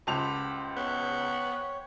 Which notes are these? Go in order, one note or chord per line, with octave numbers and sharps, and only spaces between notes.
C#2 G4 C5 F#5 A5 B5 F7
B3 C#5